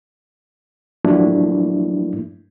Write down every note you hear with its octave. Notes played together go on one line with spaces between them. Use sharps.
F3 F#3 A3 A#3 D4 E4